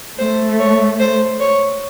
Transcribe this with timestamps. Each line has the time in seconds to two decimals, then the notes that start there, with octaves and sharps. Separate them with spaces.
0.19 A3 C5
0.59 C#5
1.00 C5
1.40 C#5